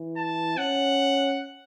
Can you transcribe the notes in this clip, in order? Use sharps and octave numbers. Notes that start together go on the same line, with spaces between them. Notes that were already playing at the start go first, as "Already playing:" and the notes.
Already playing: E3
A5
C#4 F#5